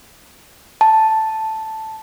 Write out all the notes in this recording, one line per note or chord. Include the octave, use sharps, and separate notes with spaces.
A5